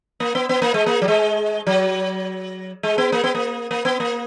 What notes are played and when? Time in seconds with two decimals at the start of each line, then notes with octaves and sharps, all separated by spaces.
0.20 A#3
0.35 B3
0.49 B3
0.62 A#3
0.74 G#3
0.86 A#3
1.02 F#3
1.08 G#3
1.67 F#3
2.83 G#3
2.98 B3
3.12 A#3
3.24 B3
3.35 A#3
3.71 A#3
3.85 B3
4.00 A#3